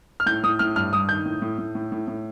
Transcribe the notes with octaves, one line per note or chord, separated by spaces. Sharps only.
F6
A2 G6
A2 D#6
A2 F6
G2 F6
G2 D#6
D#3 G6
A2
A2
A2
A2
A2
A2